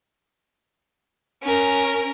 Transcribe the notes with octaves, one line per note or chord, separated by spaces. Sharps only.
C#4 A#4